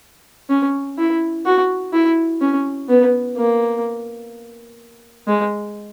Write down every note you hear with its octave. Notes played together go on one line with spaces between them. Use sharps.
C#4
E4
F#4
E4
C#4
B3
A#3
G#3